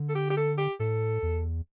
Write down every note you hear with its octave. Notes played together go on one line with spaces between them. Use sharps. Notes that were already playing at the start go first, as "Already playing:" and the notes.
Already playing: D3
A4
G4
G4
A4
G4
A2 A4
E2